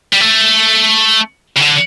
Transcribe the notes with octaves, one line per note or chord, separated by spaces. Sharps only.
G3
A3
C#3
D3